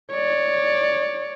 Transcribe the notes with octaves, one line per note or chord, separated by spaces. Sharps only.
C#5 D5